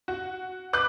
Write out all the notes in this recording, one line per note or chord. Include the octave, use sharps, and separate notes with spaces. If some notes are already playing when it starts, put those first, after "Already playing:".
F#4
B4 D6 F#6